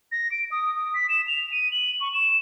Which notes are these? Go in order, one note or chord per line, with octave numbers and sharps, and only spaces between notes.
A#6
D7
D#6
D#6
B6
E7
F7
D#7
F#7
C#6
E7